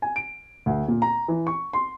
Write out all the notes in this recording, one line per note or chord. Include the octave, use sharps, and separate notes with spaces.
G#5
D7
D2
A#2
A#5
E3
C#6
C6